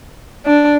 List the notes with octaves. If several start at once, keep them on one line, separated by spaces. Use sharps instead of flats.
D4